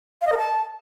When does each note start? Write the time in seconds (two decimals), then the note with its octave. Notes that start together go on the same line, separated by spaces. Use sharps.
0.22 F5
0.27 D#5
0.32 A#4
0.38 A5